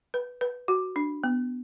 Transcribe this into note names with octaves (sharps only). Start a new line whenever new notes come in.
B4
B4
F#4
D4
B3